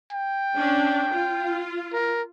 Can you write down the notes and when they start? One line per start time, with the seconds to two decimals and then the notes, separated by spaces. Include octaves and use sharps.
0.12 G5
0.56 C#4 D4
1.11 F4
1.93 A#4